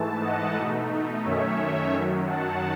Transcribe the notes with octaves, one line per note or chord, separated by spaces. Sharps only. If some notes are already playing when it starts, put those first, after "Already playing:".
Already playing: G#2 E3 A3 A5
D#5 F#5
B2 A3 D#4
F#2 D#3 A3 C#4 C#5 E5
F#2 D#3 F#3
F#5 A5